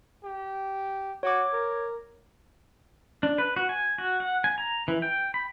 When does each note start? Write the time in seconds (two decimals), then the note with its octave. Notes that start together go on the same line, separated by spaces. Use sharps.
0.24 G4
1.23 F#4 C#5 D6
1.53 A#4
3.23 D4
3.38 B4
3.56 F#4
3.69 G#5
3.98 F#4
4.20 F#5
4.44 G#5
4.58 A#5
4.88 E3
5.02 G5
5.34 B5